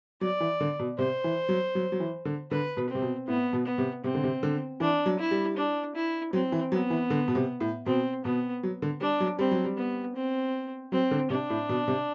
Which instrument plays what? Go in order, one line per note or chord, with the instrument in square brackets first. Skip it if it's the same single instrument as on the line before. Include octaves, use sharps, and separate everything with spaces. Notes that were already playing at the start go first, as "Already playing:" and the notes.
[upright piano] F#3 [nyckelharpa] D5
[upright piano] E3
D3
B2
[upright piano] C3 [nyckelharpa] C5
[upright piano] E3
F#3
F#3
F#3
E3
D3
[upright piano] D3 [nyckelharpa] B4
[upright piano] B2
[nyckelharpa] C4
[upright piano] C3
B2
[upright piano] A2 [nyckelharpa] B3
[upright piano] B2
[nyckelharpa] B3
[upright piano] C3
[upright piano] C3 [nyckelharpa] C4
[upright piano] D3
C3
D3
[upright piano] E3 [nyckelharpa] D4
[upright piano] F#3
[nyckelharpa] E4
[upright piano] G3
[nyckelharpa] D4
E4
[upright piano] F#3 [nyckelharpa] C4
[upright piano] E3
[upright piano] F#3 [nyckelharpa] B3
[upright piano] E3
D3
B2
C3
A2
[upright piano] B2 [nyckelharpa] C4
[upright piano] B2 [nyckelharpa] B3
[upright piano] F#3
D3
[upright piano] G3 [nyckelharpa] D4
[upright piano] F#3
[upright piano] G3 [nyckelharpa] C4
[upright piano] F#3
G3
[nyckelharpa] B3
C4
[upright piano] F#3 [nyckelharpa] C4
[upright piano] D3
[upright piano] C3 [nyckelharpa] D4
[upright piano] A2
B2
C3